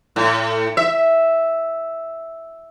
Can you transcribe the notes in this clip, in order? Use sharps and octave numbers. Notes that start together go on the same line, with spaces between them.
A2
E5